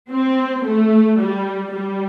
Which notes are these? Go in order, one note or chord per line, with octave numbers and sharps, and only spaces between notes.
C4
A3
G3
G3